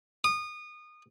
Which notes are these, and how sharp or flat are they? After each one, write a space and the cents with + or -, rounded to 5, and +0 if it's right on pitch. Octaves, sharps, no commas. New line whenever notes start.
D#6 -25